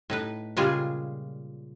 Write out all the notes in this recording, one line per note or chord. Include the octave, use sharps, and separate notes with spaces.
A2 D#4 B4
A#2 C#3 G3 G#3 F4 G#4